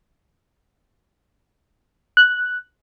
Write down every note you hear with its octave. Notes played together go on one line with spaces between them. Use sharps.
F#6